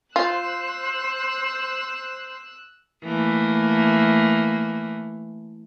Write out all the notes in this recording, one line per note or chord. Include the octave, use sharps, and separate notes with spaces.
F4 C5 E6 F#6
E3 A3 A#3